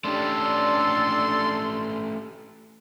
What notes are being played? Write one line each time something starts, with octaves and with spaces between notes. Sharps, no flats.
A3 C#4 D4 G4 A4 C6